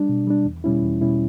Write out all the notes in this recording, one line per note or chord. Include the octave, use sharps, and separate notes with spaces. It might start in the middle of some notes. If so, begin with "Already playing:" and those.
Already playing: G3 D4
B2
G3 D4
E2
B2 G3 C#4 E4
E2
B2 G3 C#4 E4